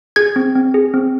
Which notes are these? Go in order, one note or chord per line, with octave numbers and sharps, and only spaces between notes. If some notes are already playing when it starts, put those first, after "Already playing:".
G#4 G#6
C4
C4
G#4
C4